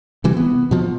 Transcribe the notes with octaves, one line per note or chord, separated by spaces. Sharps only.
C3 E3 G3
B3
B2 F3